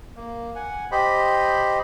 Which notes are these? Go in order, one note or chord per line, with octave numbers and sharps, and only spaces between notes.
A#3
F#5 G#5
G4 C5 D#5 B5